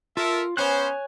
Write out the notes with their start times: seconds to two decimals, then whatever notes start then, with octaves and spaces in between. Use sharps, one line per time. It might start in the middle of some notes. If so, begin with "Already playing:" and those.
0.17 F4 A4 A#4 E5
0.57 B3 C#4 C5 C#5 G#5 F#6